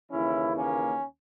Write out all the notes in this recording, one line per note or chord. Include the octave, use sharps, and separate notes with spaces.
D#2 C#3 E3 C#4 E4
A#3 C#4